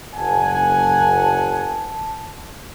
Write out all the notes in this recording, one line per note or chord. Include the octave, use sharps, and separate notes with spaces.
F#1 F#5 G#5 A5